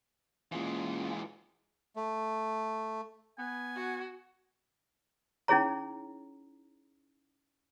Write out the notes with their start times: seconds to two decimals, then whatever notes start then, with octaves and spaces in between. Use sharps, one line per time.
0.52 E3 G#3 A#3 C#4 F4
1.96 A3
3.38 B3 G#5
3.76 F#4
5.48 C#4 D#4 E4 G#4 C#5 A#5